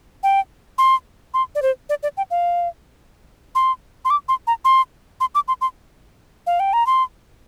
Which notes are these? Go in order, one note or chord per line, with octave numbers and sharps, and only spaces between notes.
G5
C6
C6
D5
C5
D5
D5
G5
F5
C6
C6
D6
C6
A#5
C6
C6
D6
C6
C6
F5
G5
A#5
C6